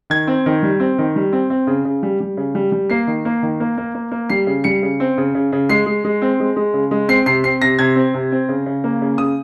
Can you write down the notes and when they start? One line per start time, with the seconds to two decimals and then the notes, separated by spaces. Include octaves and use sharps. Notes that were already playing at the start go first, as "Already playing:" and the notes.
0.10 D#3 G#6
0.27 C4
0.46 D#3
0.63 G3
0.80 C4
0.98 D#3
1.16 G3
1.33 C4
1.50 C4
1.67 C#3
1.85 C#3
2.03 G3
2.20 G3
2.37 C#3
2.55 G3
2.72 G3
2.90 A#3 C7
3.07 D#3
3.25 A#3
3.43 D#3
3.60 A#3
3.78 A#3
3.95 A#3
4.12 A#3
4.30 G3 C7
4.47 C#3
4.64 G3 C#7
4.82 C#3
5.00 C4
5.18 C#3
5.35 C#3
5.52 C#3
5.69 G#3 C7
5.86 G#3
6.04 G#3
6.22 C4
6.40 G#3
6.56 G#3
6.74 C#3
6.91 G#3
7.08 C4 C7
7.26 C3 C7
7.44 C4 C7
7.62 C3 A#6
7.79 C3 G#6
7.96 C4
8.14 C3
8.32 C4
8.49 C#3
8.66 C#3
8.84 A#3
9.01 C#3
9.18 C#3 D#6